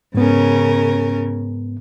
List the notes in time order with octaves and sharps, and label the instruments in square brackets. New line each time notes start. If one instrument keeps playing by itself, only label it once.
[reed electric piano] G#2 B3 [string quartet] C#3 C#4 A#4